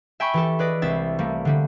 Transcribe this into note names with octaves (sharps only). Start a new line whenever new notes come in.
E5 G5 G#5 B5 C#6
E3 G4 A4
G#4 B4 D5 D#5
C2 G#3 C4 E5 A6
G3 A3 A#3
D3 G3